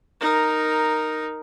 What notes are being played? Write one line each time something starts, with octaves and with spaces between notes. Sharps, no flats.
D#4 A#4